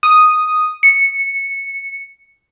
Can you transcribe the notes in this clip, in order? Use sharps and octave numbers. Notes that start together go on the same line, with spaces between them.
D#6
C#7